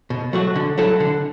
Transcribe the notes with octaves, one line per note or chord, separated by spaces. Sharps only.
B2
F#3 A3 F#4
D3
F#3 A3 E4 A4
D3